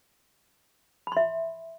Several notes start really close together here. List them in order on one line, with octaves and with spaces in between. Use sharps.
B5 C6 E5